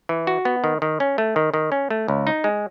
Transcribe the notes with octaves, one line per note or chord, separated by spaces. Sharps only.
E3
F#4
B3
D#3
D#3
C#4
A3
D#3
D#3
C#4
A3
C#2
D#4
G#3